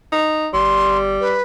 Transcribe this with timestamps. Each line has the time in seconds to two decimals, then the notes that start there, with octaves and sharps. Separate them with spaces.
0.12 D#4
0.53 G1 G3 C6
1.21 B4